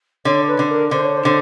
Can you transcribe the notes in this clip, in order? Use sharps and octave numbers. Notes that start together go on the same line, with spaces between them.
D3 C#5
B4
D3
A#4
D3 C5
C#5
C5
D3